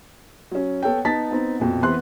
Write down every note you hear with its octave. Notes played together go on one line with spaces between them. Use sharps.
F#3 C#4
B3 A4 C#5 G5
B3 D#4 A5 A6 B6
B3 C4 D#4
A#1 F2 B2
E3 B3 C4 B4 C6 F#6